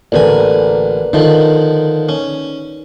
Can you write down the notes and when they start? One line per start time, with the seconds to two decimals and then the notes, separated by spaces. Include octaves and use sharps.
0.12 A1 D3 A#4 B4 D5 G#5
1.13 D3 D#3 F3 D#4
2.09 C#4